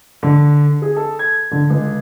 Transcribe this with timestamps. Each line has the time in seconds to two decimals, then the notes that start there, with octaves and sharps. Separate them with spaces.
0.23 D3
0.82 G#4
0.96 A4
1.19 G#6
1.51 D3
1.70 C#2